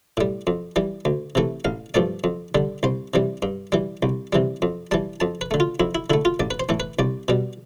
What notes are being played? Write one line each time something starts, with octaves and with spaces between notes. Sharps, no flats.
A2 G3
F2
E3 G3
D2
C3 E3 A3
A1 F5
G2 F3 A3 D5
F2
D3 G3
C2 C5
C3 E3 G3
G2
E3 G3
C2
C3 E3 G3
F2
E3 G3 A5
F2 A5
B4
D3 A3
F4
F2 E4
E4
D3 A3 E4
F4
A1 D5
B4
C5
A2 E3 A3
B4
C2 D5
B2 G3